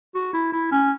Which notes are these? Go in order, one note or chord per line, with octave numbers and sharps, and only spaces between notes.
F#4
E4
E4
C#4